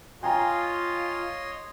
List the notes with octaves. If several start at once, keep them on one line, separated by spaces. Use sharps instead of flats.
F4 C#5 D#5 G5 G#5 A#5 C6